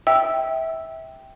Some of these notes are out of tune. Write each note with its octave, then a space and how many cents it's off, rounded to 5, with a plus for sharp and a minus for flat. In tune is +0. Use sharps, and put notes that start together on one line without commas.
E5 -20 G5 +0 E6 +0